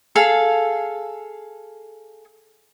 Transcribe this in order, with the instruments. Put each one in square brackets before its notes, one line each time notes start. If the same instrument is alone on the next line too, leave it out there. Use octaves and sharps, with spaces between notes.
[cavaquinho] G#4 A4 F5